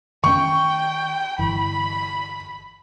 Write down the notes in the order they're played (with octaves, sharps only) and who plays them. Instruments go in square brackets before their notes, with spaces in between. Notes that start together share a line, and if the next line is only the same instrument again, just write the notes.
[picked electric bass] D#3 A3 C#4 [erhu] G5 [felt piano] C#6
[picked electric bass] G1 E3 [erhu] B5